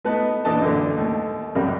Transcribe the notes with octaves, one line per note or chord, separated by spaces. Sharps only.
A3 B3 D#4 B4 A5
A#2 E3 D4 D#5 A5
F#2 A#2 D3 E3
D#2 A3
C#2 F#2 C3 G3 A#3